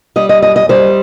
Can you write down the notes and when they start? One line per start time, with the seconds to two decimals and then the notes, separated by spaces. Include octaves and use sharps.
0.16 G3 D#5
0.29 D#5
0.42 F#2 D#5
0.56 D#5
0.69 G3 C5